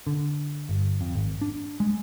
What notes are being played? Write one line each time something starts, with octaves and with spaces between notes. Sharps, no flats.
D3
G1
F2
G#1
D4
G#3